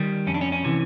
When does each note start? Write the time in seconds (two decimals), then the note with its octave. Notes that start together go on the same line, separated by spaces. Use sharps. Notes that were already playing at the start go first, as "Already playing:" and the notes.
Already playing: D#3 G3
0.27 F2 C#4
0.34 D4
0.41 C#4
0.52 C#4
0.64 C3 E3